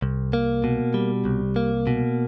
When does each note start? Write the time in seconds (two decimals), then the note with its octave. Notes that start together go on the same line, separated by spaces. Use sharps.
0.02 C2
0.33 A#3
0.64 B2
0.94 G3
1.25 C2
1.56 A#3
1.87 B2